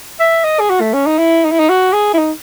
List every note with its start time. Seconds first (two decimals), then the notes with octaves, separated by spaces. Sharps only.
0.20 E5
0.44 D#5
0.60 G#4
0.70 F#4
0.81 A3
0.94 C#4
1.07 D#4
1.18 E4
1.45 D#4
1.52 E4
1.59 D#4
1.69 F#4
1.93 G#4
2.14 E4
2.18 D#4